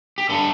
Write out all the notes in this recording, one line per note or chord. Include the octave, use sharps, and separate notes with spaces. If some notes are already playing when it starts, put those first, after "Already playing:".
G4
D3 G3 D4 A4